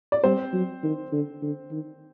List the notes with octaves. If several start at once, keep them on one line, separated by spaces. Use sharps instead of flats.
D5
G3 C4 C5
F#3
D#3
D3
D3
D#3